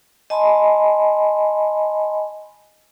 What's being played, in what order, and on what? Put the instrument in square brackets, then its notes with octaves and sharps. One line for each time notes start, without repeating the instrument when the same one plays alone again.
[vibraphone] D#5 G#5 A5 B5 C6